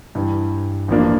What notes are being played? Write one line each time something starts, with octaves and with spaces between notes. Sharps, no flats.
G2 E3 G3
A1 G2 F3 A#3 D4